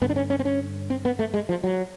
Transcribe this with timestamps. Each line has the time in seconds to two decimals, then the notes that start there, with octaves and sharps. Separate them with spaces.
0.01 G2 D3 B3
0.09 D4
0.16 C#4
0.30 C#4
0.39 C4
0.45 C#4
0.90 C4
1.05 B3
1.19 A3
1.34 G#3
1.49 F3
1.64 F#3